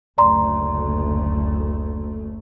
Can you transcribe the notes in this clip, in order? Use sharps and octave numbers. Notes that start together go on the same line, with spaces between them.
F#1 D2 A3 D5 A#5 C6